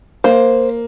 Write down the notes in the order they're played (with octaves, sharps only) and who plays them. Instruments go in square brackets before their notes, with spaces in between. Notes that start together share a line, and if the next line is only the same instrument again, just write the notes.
[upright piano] A#3 [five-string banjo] C5